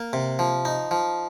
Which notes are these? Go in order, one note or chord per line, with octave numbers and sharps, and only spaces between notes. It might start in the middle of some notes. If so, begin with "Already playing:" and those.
Already playing: A#3
C3
F3
D#4
F3